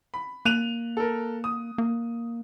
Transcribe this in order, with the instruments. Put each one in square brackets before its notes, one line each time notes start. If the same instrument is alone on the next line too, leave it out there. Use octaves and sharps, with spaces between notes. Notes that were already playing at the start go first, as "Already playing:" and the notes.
[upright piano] B5
[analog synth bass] A#3 [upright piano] F#6 D#7 F7
[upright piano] A4 A#4
D#6
[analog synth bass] A#3